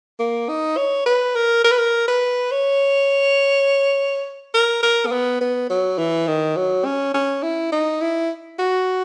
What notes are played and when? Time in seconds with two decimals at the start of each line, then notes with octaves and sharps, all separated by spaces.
0.19 A#3
0.49 D#4
0.77 C#5
1.06 B4
1.36 A#4
1.64 A#4
1.71 B4
1.78 A#4
2.08 B4
2.51 C#5
4.54 A#4
4.83 A#4
5.06 A#3
5.12 B3
5.41 B3
5.70 F#3
5.98 E3
6.27 D#3
6.57 F#3
6.85 C#4
7.14 C#4
7.43 E4
7.72 D#4
8.01 E4
8.59 F#4